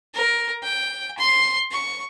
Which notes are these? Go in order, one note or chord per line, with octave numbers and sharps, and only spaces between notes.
A#4
G5
C6
C#6